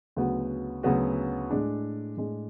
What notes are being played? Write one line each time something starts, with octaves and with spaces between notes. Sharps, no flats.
D2 C#3 F#3 B3 F#4
D2 C#3 F#3 B3 F#4
A2 G#3 D4
A2 G#3 D4